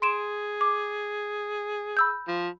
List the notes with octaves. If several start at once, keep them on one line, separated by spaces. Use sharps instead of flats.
G#4 C6 D7 E7
D6
B5 E6 G6
F3